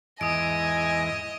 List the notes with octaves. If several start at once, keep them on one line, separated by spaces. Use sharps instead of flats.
E2 G#2 E3 D#5 G#5 D#6 D7